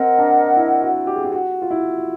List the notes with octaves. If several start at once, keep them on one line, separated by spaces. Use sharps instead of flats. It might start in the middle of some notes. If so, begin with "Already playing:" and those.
Already playing: C4 A#4 D#5 F#5
D4
E4
F#4
G4
G#4
G4
F#4
F4
E4